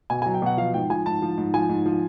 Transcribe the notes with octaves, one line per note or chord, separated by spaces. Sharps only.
B2 G#5
G#5
F#3
G5
B2 F#5
F3 F5
G#2 G5
F3 G#5
G#2 A5
F3
G#2
F3 G#5
G#2
F3